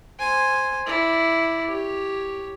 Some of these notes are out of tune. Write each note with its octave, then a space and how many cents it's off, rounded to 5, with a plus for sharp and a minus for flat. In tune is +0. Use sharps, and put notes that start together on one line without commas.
C5 +0 G#5 -5
E4 +0 D5 +0
G4 +0 C#5 +0